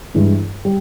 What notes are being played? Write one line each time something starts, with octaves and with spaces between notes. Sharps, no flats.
G2 E3 G#3
G3